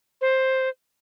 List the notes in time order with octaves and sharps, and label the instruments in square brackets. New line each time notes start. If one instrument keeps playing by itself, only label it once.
[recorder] C5